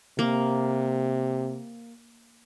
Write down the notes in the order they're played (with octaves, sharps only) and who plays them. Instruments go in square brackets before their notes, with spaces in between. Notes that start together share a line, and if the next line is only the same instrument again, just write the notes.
[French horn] C3 [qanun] A#3